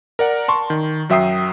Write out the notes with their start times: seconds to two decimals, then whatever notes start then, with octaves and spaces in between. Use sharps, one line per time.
0.19 A#4 D5 F#5
0.48 A5 C6 C#6
0.70 D#3
1.09 F#2 F#3 E5 G5 D#6 C7